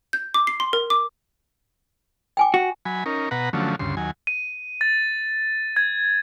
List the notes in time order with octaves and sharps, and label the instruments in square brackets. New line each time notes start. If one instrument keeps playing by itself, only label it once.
[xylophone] G6
D6
C7
C6
A#4
D6
[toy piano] G5 G#5 D6
[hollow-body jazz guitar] F#4
[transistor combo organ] F#3 G#5 B5
C#4 D#4 A#4
B2 B4 F#5 A#5
D3 F3 F#3 A3 C#4
D2 G2 C#3 C6
D#2 F#3 G#5
[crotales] D#7
A6
G#6